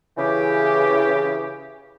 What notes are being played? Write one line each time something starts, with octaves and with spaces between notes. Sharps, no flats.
C#3 E3 G4